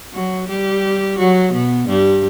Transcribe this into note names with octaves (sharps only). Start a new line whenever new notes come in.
F#3 F#4
G3 G4
F#3 F#4
B2 B3
G2 G3